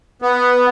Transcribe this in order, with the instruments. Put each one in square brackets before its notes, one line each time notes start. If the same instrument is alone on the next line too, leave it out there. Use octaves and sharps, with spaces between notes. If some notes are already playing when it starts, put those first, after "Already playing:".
[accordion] B3